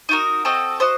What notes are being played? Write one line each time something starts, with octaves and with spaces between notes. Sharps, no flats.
D#4 F#4 A#4
C4 F#4 A4 D#5
F#4 C5 D#5